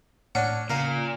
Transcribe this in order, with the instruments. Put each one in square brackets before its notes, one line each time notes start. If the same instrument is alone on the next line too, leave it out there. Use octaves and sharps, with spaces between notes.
[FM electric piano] A2 [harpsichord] C#4 D4 G#5 [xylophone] F#5
[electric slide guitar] A#2 [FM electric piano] C#3 [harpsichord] A#4 F5